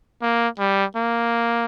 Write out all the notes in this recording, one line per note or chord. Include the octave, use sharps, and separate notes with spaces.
A#3
G3
A#3